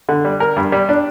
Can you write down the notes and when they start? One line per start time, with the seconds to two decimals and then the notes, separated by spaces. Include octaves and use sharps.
0.09 D3
0.25 G3
0.40 A#4
0.56 G2
0.72 G3
0.89 D4